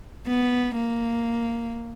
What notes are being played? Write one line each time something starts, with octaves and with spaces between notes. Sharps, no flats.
B3
A#3